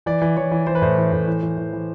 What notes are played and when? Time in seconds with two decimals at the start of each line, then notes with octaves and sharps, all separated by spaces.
0.06 E3 D5
0.21 E3
0.37 E3 C#5
0.51 E3
0.67 E3 C5
0.75 B4
0.82 A2 C5
0.97 E3
1.12 A2
1.27 E3
1.43 E3
1.58 E3
1.73 E3